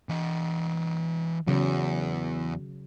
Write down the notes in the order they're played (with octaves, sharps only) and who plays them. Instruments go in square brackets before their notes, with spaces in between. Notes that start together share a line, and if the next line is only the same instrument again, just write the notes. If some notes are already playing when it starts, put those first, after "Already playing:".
[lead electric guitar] E3 D#5
[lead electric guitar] E2 [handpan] C#3 F#3